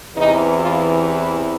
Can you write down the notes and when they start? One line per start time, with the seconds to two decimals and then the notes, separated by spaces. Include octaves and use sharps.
0.16 E2 C3 E3 D#4
0.59 F4
1.03 B4